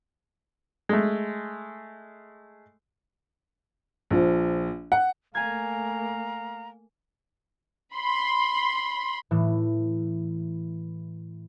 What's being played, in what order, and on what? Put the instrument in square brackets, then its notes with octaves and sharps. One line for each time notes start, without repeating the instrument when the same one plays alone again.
[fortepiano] G#3 A3
[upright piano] A#1 F3
F#5
[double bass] A3 A#3 [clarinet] F5 [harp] G#5 G#6 [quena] A#5
[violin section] B5 C6
[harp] A2 E3